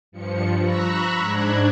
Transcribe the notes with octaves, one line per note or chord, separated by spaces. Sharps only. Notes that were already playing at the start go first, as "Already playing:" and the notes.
G2 F3 C#7
A#5 B5 C#6 E6 F#6 A#6
G#2 D4 F#6 G#6